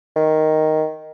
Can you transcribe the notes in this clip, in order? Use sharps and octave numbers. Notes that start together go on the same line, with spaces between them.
D#3